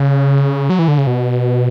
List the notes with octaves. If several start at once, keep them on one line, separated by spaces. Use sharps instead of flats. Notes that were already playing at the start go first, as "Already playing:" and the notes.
Already playing: C#3
F#3
E3
D3
C#3
B2